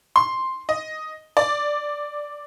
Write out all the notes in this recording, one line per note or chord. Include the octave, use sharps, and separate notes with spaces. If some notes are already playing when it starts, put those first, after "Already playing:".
C6
D#5
D5